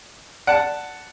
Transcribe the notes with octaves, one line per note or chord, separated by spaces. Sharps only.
D5 F#5 A5